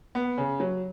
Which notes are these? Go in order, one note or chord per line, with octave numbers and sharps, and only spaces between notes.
B3
C#3
F#3